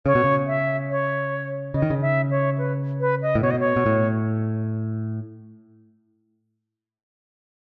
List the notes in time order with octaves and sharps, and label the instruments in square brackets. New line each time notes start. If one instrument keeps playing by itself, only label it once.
[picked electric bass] C#3 [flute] C#5
[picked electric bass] B2
C#3
[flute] E5
C#5
[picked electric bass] C#3 [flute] D#5
[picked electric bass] D#3
C#3
[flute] E5
C#5
B4
B4
D#5
[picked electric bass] A2
[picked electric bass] B2 [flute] C#5
[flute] D#5
C#5
[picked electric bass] B2
A2